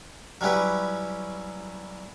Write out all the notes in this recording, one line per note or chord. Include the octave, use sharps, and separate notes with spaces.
F#3 G3 C#4 E4 G4 B4